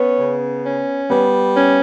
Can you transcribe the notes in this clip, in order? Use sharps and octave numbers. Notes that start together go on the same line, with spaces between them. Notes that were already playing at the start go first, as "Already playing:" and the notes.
Already playing: B3 C#4
C#3
C#4
G3 B3
C#4